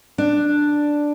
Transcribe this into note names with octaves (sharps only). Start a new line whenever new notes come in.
D4